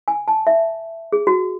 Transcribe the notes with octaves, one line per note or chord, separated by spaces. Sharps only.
G#5
A5
E5
G#4
F#4